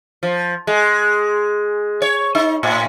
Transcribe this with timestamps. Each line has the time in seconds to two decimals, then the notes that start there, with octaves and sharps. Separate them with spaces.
0.23 F3
0.67 G#3
2.02 C#5
2.35 D#4
2.63 A2